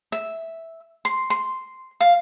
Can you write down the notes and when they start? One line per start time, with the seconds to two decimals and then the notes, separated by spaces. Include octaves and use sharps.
0.12 E5
1.05 C6
1.30 C6
2.00 F5